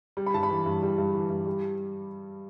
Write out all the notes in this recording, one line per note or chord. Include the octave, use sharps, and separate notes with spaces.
G3
B5
G2 A5
B5
E3
G2
G3
G2
E3
G2
G3